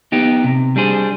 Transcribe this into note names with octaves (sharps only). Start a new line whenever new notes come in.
B3 D#4 G4
C3
G3 D4 G#4 C5